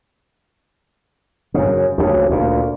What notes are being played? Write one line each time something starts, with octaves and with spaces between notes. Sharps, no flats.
F#2 C#3
D2 C#3
D2 A#2